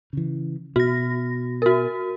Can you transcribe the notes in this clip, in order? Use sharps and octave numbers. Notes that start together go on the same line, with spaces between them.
C#3 E3
B2 F#4 A#6
F#4 A#4